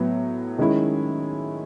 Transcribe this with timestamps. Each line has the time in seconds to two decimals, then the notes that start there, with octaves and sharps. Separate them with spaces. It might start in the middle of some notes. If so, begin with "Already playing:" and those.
Already playing: A2 F#3 B3
0.58 D#3 G#3 C#4 E4